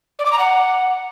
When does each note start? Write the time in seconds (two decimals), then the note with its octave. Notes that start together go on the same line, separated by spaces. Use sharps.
0.19 D5
0.25 D6
0.32 A#5
0.39 F#5